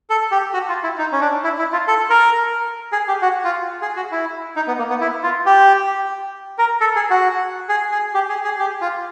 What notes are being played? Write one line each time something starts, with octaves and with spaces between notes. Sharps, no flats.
A4
G4
F#4
F4
E4
D#4
C#4
D4
E4
E4
F4
A4
A#4
G#4
G4
F#4
F4
G#4
F#4
E4
D#4
B3
A#3
B3
E4
F4
G4
A#4
A4
G#4
F#4
G#4
G#4
G4
G#4
G#4
G4
F4